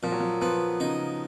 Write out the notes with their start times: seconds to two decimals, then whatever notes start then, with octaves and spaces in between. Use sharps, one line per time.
0.03 A#2 F3
0.12 F#3
0.20 F3
0.41 F3 B3
0.80 C#3 D#4